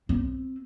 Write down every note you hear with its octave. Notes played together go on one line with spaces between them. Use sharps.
C4